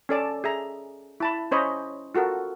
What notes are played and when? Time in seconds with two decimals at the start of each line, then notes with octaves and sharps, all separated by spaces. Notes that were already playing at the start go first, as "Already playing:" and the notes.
0.09 C#4 A4 D5 A5
0.44 G#4 E5 A#5
1.20 E4 A5 B5
1.51 C#4 C5 C#5 D#5 B5
2.15 F4 F#4 A4 A#4